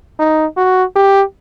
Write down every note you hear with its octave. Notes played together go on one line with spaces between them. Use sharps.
D#4
F#4
G4